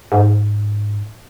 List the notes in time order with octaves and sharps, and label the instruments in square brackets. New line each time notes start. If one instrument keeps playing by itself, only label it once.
[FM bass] G#2